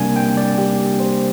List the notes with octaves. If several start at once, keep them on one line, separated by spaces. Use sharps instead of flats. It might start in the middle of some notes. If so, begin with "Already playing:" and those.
Already playing: C3 G3 A#3 D4 G#5
G5
D5
G4
C5